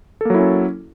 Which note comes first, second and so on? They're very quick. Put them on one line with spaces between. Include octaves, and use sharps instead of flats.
A4 A#3 F#3 E4 C#4